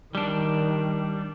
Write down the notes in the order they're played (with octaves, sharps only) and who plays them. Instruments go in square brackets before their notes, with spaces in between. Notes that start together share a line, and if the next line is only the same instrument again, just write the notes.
[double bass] D#3 [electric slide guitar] G3 D4